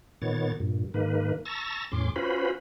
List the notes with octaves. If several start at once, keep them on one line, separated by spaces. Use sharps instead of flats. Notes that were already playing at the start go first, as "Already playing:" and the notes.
A#2 D#3 B3 C#5 A6
G2 A#2
G#2 D#3 A#3 B4
A5 A#5 C#6 E6 A6 A#6
E2 A2 C#4 C6 D6
C#4 F4 F#4 B4 C5 B5